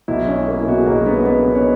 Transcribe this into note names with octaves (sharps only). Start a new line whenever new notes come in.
B1 E4
C#4
A#3
E4
B2 F#4
G#4
B1 A#3 A#4
B3 C#4 B4
A#3 B3 B4
B2
C#4 C#5